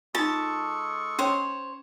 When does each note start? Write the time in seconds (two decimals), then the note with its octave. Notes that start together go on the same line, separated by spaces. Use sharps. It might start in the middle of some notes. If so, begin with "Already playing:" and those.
0.15 G#3 D#4 F4 A4 A5 C#6
1.19 C#4 C5 C#5